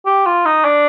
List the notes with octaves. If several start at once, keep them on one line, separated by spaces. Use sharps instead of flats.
G4
F4
D#4
D4